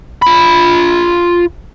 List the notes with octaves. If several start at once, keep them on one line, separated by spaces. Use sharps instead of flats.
F4 B5